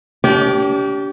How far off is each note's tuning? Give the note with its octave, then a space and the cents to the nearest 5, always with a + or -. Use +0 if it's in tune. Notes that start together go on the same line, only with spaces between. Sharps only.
D4 -45 G4 -15